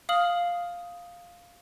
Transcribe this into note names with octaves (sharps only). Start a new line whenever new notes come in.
F5 D#6 F6 F#7